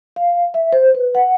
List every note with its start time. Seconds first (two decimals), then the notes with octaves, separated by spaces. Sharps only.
0.16 F5
0.54 E5
0.73 C5
0.95 B4
1.15 F#5